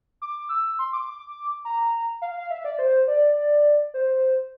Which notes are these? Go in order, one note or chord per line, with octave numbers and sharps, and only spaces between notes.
D6
E6
C6
D6
D6
A#5
F5
F5
E5
D5
C5
D5
C5